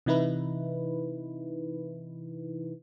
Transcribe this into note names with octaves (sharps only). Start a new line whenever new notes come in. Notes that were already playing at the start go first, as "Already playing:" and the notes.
C3 E3 D#4 E4 B4